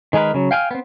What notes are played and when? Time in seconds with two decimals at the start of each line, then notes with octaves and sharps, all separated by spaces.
0.13 D#3 G#3 G#4 A#4 B4
0.34 C#3 F#3
0.51 F5 G5 G#5 F6
0.71 B3 C4